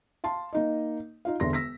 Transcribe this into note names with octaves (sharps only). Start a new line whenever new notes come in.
F5 A5 C6
A#3 D#4 D#5
D#4 F4 F5
E1 D3 E5 C6 A#6
E6 A#6 B6